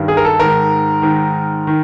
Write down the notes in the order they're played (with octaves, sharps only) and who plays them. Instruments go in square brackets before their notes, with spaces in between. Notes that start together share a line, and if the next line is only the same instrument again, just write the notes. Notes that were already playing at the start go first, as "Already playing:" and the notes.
Already playing: [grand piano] G2 D#3
G#4
A#4
A4
G#2 D#3 A#4
G#2 D#3
D#3